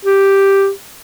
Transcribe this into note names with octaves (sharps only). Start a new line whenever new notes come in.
G4